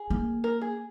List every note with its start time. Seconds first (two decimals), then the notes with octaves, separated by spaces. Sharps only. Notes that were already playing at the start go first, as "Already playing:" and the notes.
Already playing: G#4
0.10 A#3
0.44 A#4
0.61 G#4